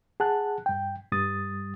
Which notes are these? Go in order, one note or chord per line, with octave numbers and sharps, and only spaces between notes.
G#4 F#5 A5 F#6
G2 G5
G2 G3 D#6 A6